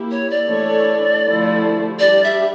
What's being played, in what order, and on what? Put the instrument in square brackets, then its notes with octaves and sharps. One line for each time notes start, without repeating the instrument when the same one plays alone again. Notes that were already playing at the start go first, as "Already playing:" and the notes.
Already playing: [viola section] A#3 E4 G4
[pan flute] C#5
D5
[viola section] E3 A3 D4 A4 C#5
D3 F3 A3 E4 G4
[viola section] G3 D4 G4 [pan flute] D5
[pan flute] E5